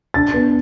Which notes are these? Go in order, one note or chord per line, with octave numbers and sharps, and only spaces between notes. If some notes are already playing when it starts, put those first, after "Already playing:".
D4 A6
B3